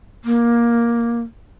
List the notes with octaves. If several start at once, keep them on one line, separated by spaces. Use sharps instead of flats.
A#3